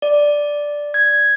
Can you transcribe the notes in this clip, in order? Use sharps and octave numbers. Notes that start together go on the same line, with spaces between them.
D5
G#6